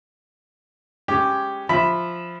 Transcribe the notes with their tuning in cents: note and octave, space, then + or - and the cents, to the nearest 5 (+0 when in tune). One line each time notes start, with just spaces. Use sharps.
G#3 +0 C#4 +0 G4 +0
F3 +0 E5 +0 B5 +0